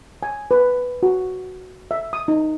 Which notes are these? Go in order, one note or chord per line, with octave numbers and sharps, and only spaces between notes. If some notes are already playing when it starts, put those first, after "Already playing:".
G#5
B4
F#4
E5
D#6
D#4